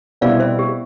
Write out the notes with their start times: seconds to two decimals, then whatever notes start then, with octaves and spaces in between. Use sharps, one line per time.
0.21 B2 G3 C4 E4 D5 F5
0.40 C5 E5
0.59 G4